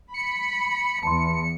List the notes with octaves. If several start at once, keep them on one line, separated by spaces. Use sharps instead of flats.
B5 C#7
E2 A5 B5 C6